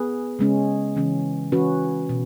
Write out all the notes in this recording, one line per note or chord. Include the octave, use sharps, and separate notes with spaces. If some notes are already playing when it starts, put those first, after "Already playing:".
Already playing: B3 G#4 B4
C#3 G#3 C#4
C#3 E3 C#4
E3 C#4 F#4 B4
B2